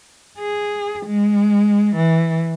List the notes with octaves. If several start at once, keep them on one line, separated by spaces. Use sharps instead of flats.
G#4
G#3
E3